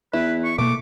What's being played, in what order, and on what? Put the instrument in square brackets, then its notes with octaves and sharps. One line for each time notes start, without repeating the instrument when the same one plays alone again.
[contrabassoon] E2 [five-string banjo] E4 [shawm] B4
[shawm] C#6
[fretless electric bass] B2 A#3 [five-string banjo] A3 [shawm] D6